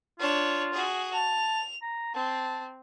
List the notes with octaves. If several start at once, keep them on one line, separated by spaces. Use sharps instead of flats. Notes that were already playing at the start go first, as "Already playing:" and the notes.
D4 F4 C#5
F#4 G#4
A5 F7
A#5
C4 A5